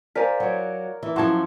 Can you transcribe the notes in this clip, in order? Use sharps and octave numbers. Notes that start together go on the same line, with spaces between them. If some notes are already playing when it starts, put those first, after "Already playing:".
F4 A#4 C5 D5 G#5 B6
F#3 C#5 D5 F#5
E3 E5
F#2 F3 F#4 A5 C6 C#6 G#6